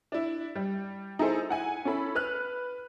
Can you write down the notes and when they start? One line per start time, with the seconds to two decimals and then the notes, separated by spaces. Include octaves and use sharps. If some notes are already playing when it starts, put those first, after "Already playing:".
0.12 D4 E4
0.56 G3
1.19 D#4 E4 G#4 A4 C5
1.49 E4 F#5 G#5
1.85 C#4 E4 A4 B5
2.15 B4 F6 F#6